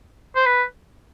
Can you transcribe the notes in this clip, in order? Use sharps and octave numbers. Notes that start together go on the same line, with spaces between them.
C5
B4